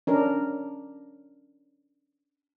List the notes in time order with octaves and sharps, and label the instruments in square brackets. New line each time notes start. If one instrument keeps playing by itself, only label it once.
[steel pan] C#4 D4 A#4